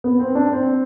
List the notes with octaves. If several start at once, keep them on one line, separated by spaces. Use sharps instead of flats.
B3
C4
D4
C4